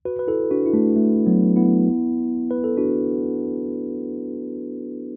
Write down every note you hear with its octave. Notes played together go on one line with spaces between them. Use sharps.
F#4 B4
B4
E4 A4
D4 F#4
E4
A3 D4
A3
F#3 B3
B3 E4
B4
A4
D4 F#4